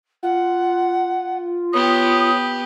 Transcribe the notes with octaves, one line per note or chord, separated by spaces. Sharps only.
F4 F#5
B3 G4 C#5 D#6